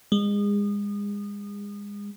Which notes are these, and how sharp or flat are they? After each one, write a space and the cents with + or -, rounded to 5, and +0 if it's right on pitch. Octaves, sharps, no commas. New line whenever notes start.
G#3 -30